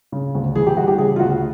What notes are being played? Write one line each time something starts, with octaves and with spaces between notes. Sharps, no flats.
C#3
D2
E3 G#4
G4
G3 F#4
G4
C#3 G#4
F4
D2 F#4